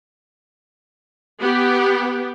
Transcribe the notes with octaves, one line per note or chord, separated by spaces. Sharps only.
B3 G4